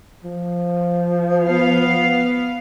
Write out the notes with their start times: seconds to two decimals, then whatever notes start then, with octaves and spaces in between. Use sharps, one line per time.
0.24 F3
1.43 B3 F5